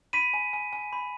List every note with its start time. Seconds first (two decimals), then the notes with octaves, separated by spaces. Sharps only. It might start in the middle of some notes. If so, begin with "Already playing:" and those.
0.13 B5 B6 D#7
0.34 G#5
0.53 G#5
0.73 G#5
0.93 B5